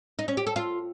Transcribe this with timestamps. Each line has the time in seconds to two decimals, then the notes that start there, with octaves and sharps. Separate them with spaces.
0.19 D#4
0.28 C#4
0.37 G4
0.47 A4
0.56 F4